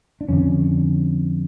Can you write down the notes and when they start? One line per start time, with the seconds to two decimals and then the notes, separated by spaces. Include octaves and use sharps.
0.21 D4
0.29 F2 D3 C#4